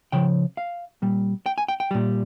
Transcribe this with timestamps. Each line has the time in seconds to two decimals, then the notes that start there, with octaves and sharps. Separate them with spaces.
0.12 C#3 F3 G5
0.57 F5
1.02 A#2 G3
1.46 G5
1.58 G#5
1.68 G5
1.80 G5
1.91 A#2 G3